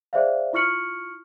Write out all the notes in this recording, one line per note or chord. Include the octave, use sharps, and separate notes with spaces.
G#4 C5 D5 E5 F5
E4 F4 C#6 F6 C#7 F#7